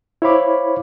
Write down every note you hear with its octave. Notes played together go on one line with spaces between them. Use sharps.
E4 C5 C#5 F5 B5 D6